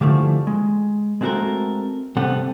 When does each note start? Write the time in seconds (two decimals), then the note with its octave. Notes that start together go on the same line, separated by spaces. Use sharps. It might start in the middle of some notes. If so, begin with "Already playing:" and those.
0.01 D3 E3 F3 G3 A3
0.47 G#3
1.21 G#3 A3 C4 F#4 A4 A#4
2.17 C3 G3 B3 C4 A4 F#5